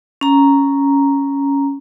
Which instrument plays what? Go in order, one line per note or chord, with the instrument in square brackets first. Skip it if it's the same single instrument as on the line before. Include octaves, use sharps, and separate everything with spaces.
[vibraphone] C#4 A#5